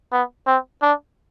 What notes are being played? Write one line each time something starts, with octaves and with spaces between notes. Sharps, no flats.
B3
C4
D4